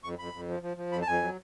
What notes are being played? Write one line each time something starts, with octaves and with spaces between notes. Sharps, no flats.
F2 C#6
F2 B5
F2
F3
F3
F3
F2 B5
A5
F2 G#5
F#3